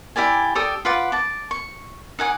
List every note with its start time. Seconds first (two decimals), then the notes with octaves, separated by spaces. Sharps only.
0.16 E4 G4 D5 G#5
0.55 G4 A4 D5 D#6
0.85 F4 B4 F#5 D6
1.12 A5 D6
1.51 C#6
2.19 D#4 F#5 G#5 D6